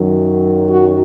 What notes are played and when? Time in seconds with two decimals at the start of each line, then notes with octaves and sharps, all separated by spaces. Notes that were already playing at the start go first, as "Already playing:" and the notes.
Already playing: F#2 D#3 F#3
0.68 F#4